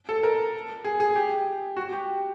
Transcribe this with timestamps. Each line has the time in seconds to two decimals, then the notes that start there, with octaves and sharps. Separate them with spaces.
0.09 A4
0.23 A#4
0.84 G#4
1.00 G#4
1.16 G4
1.77 F#4
1.92 G4